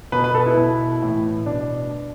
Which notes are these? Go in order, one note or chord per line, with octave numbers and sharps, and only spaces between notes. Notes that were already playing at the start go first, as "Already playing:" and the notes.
B2 B4
B4
A4
E4
B2
A2 E3
B2 D4